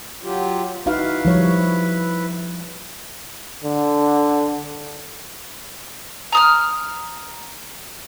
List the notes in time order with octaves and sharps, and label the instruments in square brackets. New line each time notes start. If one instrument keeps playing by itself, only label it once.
[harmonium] F#3 F4 G4
[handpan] D#4 F#4 F5 [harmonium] E4 B4
[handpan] F3 G3 C#5
[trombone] D3
[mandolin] A#5 D#6 F6